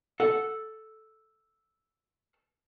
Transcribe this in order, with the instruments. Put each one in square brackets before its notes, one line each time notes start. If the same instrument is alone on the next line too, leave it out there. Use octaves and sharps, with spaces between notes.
[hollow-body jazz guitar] A4 F#5